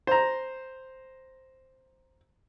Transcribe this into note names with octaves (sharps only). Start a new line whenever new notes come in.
C5 A#5